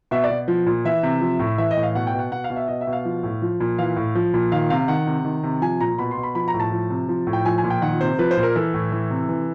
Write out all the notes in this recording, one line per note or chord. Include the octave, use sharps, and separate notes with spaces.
B2 E5
D5
B2
F3
A#2
E3 E5
C3
F3
A2
E3 E5
D#5
A2
F5
B2 F#5
G5
B2
F#5
B2 F#5
F5
B2
E5
B2 D#5
E5
B2
F5
F3
A2
F3
A#2
E3 F5
A2
F3
A#2
D#3 F5
C3 F5
D#3 F#5
C3
D#3
C3
F3 G#5
A#2 A#5
B2 B5
C6
B2
B5
F3 B5
A#5
A2
A5
F3
C3
F3
A2
G5
F3 G#5
G#5
A#2
G5
D#3 F#5
C3 C5
F3 B4
C5
A#2
A#4
E3 A4
A2
E3
C3
E3